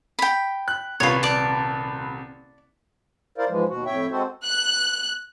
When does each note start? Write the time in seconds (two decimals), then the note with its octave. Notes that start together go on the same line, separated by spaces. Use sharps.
0.19 G5 B5
0.68 F#6
1.00 D#1 C2 F4 B4 C#5
1.23 D5 A5
3.38 E4 A#4 C5 D5 F5
3.49 G#2 E3 F3 G#3
3.69 D#2 B2 F#4
3.86 F2 A2 C#5 E5 G5
4.11 G#3 C4 F#4 A4 C5
4.45 F#6